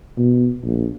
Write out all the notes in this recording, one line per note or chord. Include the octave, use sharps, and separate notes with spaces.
B2
A#1